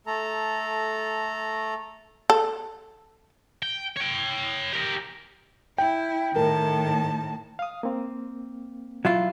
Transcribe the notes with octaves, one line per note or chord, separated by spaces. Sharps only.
A3 A4 A#5
A4
G5
C#5 G5
G4 A#4
E4 G5
A2 D#3 A#4 A5
F5 D#6
A#3 C4
F#3 E4 F4